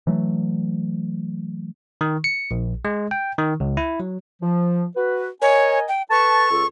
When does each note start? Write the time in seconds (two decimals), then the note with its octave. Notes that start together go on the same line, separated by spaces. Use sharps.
0.07 E3 F#3 A3
2.01 D#3
2.24 C#7
2.51 A#1
2.85 G#3
3.11 G5
3.38 D#3
3.60 C#2
3.77 E4
4.00 F#3
4.42 F3
4.96 F#4 B4
5.42 A#4 C#5 D#5 G#5
5.88 G5
6.11 A4 B4 A5 C#6
6.51 C#2 F4 A4